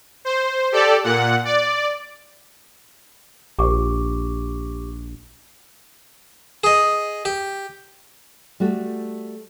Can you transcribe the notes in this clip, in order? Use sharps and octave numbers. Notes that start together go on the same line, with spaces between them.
C5
G4 A4 D5
A#2 F#5
D5
A#1 G4 C#6 D6
G#4 D#5
G4
G3 A3 F#4 A4